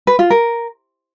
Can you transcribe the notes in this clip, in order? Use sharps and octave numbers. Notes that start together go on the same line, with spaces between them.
B4
F4
A#4